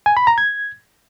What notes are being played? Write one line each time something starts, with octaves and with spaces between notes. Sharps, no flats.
G#5
B5
A#5
G#6